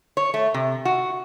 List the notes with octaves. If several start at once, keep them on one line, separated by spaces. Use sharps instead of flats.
C#5
A3
C3
F#4